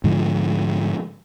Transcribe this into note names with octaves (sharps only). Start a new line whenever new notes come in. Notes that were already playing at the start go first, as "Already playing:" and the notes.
G#2 D3 F3